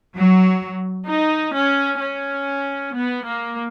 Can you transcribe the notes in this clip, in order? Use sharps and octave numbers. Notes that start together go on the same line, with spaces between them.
F#3
D#4
C#4
C#4
B3
A#3